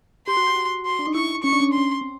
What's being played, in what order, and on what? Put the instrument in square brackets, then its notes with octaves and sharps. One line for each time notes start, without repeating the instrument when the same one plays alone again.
[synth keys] G4 [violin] C6
[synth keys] F#4
G4
F#4
[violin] C6
[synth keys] D4
D#4
[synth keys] E4 [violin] C#6
[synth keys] C#4 [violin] C#6
[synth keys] D4
C#4
D4
[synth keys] C#4 [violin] C6
[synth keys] C4